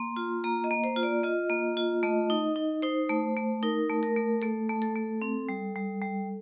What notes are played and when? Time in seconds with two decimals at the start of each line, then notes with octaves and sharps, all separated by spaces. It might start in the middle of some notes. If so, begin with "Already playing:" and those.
Already playing: A#3 C6
0.16 F4
0.44 A#3 A#5
0.64 D#5
0.71 A#3
0.84 C5
0.96 F4
1.03 D5
1.23 F4 D#5
1.50 A#3
1.77 F4
2.03 A3 D#5
2.30 D#4
2.56 D#4
2.83 D#4 C5
3.10 A3
3.37 A3
3.63 D#4 A#4
3.90 A3
4.03 A#4
4.16 A3
4.42 A3 A4
4.69 A3
4.82 A4
4.95 A3
5.22 C4
5.49 G3
5.76 G3
6.02 G3